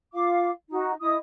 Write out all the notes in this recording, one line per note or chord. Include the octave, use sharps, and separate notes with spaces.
F4 F5 D6
D#4 F#4
E4 D#5 D#6